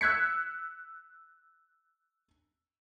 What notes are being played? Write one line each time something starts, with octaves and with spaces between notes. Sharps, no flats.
E6 F#6 G#6 B6 C#7